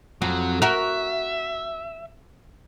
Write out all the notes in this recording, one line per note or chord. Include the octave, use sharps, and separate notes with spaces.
F2 F#3
F#4 A#4 E5